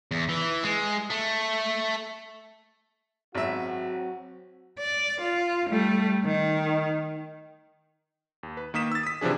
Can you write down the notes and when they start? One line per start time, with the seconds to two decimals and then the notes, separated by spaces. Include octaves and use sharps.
0.11 E2
0.29 E3
0.63 G#3
1.10 A3
3.35 G#1 F#3 C4 F#4 E5
4.78 D5
5.21 F4
5.69 G3 A3
6.25 D#3
8.43 D#2
8.57 B4
8.74 D#3 A#3 D#6 B6 E7
8.92 E6 A6
9.03 D#6 B6
9.21 C3 E3 F3 D4 G#4